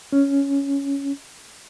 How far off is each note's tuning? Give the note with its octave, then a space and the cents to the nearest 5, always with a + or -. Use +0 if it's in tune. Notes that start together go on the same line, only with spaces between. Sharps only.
C#4 +5